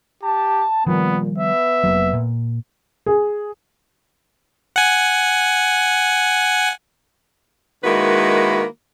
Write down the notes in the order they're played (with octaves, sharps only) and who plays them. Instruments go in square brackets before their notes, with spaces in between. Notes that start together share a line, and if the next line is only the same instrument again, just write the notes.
[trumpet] G4 [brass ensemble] A5
[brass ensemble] A#2 [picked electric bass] D#3 F3 G3 [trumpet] B3
[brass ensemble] B3 B4 [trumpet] E5
[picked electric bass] F1 F#3 A#3
A#2
[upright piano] G#4
[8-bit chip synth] F#5 G#5
[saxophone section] D#3 G#3 A#3 E4 F#4 B4